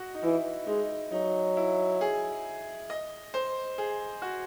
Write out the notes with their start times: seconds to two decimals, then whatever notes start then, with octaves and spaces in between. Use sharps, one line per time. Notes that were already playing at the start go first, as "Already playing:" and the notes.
Already playing: F#4 D#5
0.15 D#4
0.23 E3 E4
0.67 G#3 D#4
1.12 F#3 D#4
1.57 E4
2.01 G#4
2.90 D#5
3.34 C5
3.78 G#4
4.22 F#4